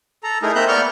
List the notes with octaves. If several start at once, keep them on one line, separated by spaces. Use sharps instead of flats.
A4 A#5
A3 D#4 E4 G#4 A#4
A#3 C4 E5 A#5 F#6 G6
B3 A#4 D5 C#6 F6 G6